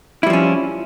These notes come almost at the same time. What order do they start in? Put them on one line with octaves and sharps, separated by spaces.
E4 G3 F3 C#4